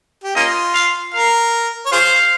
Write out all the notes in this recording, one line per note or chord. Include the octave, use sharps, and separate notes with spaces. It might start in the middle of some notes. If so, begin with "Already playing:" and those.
G4
A#3 C#4 F4 D#5
F5
A#4 F5
C#5
F4 G#4 C5 F5